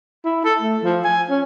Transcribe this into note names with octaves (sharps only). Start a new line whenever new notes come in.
E4
A4
A3
F3
G#5
C#4